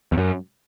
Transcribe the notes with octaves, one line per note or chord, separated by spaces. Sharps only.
E2
F#2